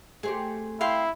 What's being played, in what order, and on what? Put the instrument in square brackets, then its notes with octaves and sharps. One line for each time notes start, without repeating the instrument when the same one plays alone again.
[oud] A3 C4 G4 [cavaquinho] G#4
[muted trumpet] E4 [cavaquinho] F5 G5 C6